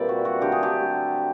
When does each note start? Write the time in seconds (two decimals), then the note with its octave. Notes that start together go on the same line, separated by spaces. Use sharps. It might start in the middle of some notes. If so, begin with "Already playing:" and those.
Already playing: A#2 G3 C4 B4 D5 E5
0.09 F#4
0.25 F#4
0.41 D3 F#3 A3 G4
0.52 G#4
0.63 G4